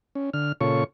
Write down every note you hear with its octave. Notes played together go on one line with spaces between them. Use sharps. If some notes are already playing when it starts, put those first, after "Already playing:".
C#4
D3 F6
A#2 C#3 F4 A4 C#5 C#6